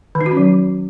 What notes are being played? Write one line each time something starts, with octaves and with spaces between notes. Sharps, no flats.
D#3
D#4
F#4
C#4
F#3